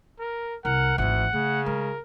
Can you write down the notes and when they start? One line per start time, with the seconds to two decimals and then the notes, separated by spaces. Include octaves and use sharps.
0.19 A#4
0.65 C2 A#4 F#5
0.98 G#1 D2 E3 F#5
1.33 C#3 A3
1.66 G#3 A#4